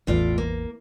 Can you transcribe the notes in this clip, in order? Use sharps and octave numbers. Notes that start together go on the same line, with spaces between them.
A1 E2 A2 E3 F4 D5
A#3